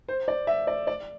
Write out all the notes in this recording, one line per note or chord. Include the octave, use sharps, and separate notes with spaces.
C5
D5
E5
D5
D5